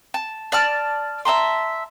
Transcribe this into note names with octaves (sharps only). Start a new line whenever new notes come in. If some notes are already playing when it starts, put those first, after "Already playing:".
A5
D5 A5 F6
E5 A5 A#5 C6